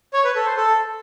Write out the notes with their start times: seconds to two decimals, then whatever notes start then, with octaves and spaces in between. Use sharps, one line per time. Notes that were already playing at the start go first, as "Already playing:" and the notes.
0.13 C#5
0.24 B4
0.35 A4
0.46 C5
0.57 A4